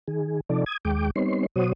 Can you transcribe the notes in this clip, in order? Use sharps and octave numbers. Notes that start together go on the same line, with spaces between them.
D#3 G#4
C3 F3 D#4 A4 D5
D#6 G#6
D#2 G#3 G5 D6
G3 B3 C4 D#4 C#5 C6
B2 F#3 F#4 C5 C#5 D#6